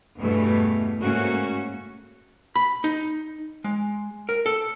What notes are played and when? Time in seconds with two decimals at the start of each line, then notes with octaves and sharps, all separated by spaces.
0.19 E2 G2 B2 E3 A3
1.00 G#2 C#3 A3 A#3 C#4 F#4
2.56 B5
2.84 D#4
3.64 G#3
4.29 A#4
4.46 A4